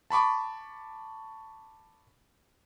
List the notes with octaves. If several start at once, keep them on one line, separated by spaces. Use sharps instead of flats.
A5 B5 C#6 D6